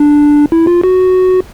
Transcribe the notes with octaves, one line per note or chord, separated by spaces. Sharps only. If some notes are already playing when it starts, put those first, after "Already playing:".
Already playing: D4
E4
F4
F#4